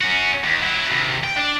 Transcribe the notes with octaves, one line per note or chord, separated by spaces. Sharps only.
C#4 F#4
D#2
F#3 E4
D#2 C3
G5
D4 D5